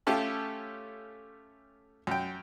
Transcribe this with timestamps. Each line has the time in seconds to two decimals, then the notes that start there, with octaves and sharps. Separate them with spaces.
0.07 A3 C#4 F4 G4 A4
2.07 F#2 G5